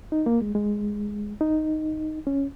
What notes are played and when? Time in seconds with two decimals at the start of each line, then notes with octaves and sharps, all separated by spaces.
0.12 D#4
0.26 A#3
0.42 G#3
0.55 G#3
1.41 D#4
2.27 C#4